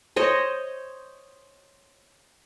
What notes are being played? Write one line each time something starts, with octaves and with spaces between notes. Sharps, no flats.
C5 C#5 D#5